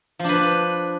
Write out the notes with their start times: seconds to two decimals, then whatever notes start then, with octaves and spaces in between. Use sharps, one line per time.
0.19 F3
0.24 D4
0.29 B4